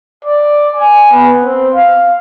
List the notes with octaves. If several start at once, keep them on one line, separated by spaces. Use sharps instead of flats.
D5
G#5
B3
C4
F5